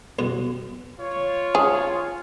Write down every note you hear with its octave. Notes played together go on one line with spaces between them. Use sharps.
C2 F#2 B2
F4 C#5
G4 G#4 C5